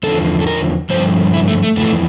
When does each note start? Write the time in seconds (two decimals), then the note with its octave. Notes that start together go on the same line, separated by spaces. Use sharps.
0.03 E2 D3 F3 A4
0.41 A4
0.47 A#4
0.90 G2 D3 F3 C5
1.34 E4
1.48 A3
1.63 A3
1.77 F2 E3 A3